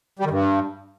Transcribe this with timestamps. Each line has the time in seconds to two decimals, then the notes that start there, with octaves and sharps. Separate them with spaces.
0.19 G3
0.25 D#3
0.30 G2